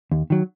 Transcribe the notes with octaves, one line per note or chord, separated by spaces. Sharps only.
D#2
D#3 F#3